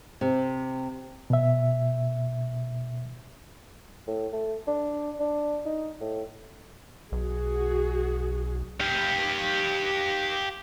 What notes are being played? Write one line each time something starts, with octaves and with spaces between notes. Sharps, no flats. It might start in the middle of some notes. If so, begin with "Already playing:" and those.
C3
B2 E5
A2
A3
D4
D4
D#4
A2
B1 F#4 G#4
G4 F5